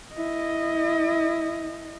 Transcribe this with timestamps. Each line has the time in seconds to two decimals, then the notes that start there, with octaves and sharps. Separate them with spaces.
0.14 E4 D#5